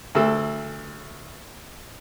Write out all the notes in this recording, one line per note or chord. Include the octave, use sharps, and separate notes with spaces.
D2 A4